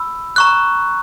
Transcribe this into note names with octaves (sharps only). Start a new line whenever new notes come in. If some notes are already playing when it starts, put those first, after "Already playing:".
Already playing: B5 E6
A#5 C#6 F#6